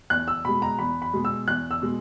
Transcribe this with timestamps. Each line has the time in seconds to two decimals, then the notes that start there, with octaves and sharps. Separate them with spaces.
0.10 E2 F#6
0.28 E6
0.45 B2 G#3 B5
0.62 A#5
0.79 E2 B5
1.02 B5
1.14 B2 G#3
1.25 E6
1.47 E2 F#6
1.71 E6
1.82 B2 G#3